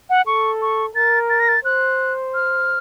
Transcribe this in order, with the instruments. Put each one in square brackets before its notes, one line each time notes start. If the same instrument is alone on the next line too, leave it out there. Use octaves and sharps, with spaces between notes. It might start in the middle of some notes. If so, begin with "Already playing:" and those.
[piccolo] F#5
[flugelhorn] A4 [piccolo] C#6
[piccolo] C#6
[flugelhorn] A#4 [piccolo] A6
[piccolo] A6
A#6
A6
[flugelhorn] C5 [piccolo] F#6
[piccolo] F6